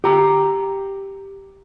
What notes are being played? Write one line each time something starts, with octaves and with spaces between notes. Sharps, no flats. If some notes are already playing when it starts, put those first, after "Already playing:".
G4 A#5